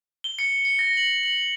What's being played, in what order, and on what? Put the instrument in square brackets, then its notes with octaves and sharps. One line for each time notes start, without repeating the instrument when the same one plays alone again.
[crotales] G7
C#7
C#7
A#6
F#7
F#7